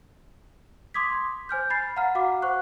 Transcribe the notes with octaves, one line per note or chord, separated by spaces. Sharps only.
C6 D6 D#6 G#6 B6
C5 G#5 F6 G6
B5 A6 C7
F5 F#5 A#5 B5 F6
F#4 F5 F#5 D6
C5 F#5 C#6 F#6